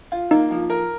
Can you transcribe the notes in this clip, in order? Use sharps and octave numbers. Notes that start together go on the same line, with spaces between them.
F4
A#3 D#4
F3
A#4